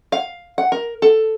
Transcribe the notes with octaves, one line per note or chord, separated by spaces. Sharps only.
F5
F#5
A#4
A4